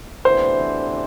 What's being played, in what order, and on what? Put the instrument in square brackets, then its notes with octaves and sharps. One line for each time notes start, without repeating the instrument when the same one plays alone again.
[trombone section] D2 C3 E3 B3 D4 [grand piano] C5